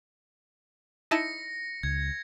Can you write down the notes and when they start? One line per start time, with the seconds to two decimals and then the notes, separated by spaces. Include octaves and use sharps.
1.11 D#4 E4 A5 A#6 C#7
1.83 C#2 G#6